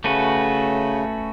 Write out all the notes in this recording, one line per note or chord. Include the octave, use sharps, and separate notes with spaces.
C#3 A3 C#4 F#4 B4